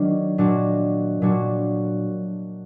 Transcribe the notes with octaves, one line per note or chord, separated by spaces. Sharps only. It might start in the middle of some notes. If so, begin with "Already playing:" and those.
Already playing: D#3 F#3 D4
A#2 F#3 D4 F#4
A#2 F#3 D4 F#4